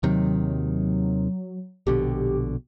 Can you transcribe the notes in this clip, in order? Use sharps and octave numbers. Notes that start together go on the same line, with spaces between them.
D#2 C3 D#3 F#3
A#1 B2 D3 G4